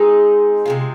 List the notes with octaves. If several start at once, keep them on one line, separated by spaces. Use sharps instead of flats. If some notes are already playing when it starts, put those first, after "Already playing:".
Already playing: G#3 C4 D#4 G#4
C3 G#3 F4